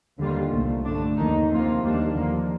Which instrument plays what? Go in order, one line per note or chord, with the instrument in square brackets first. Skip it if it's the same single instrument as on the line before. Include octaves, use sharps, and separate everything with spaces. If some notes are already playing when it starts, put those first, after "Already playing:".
[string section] D#2 D3 G3 A#3 F4
C2 A#2 A3
G2 D3 A3 D4
D#2 D#3 A#3 D#4
C3 F3 A#3 F4
D#2 D#3 G3 A#3 D4
D#2 D3 F3 A#3